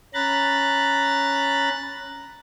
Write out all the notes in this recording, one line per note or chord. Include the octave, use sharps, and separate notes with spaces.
C#4 A#5 B5 F#6 A6